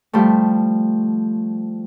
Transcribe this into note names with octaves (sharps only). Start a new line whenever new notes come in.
F3 G3 A3